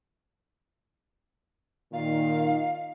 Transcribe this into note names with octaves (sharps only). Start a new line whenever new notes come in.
A#2 D#3 F5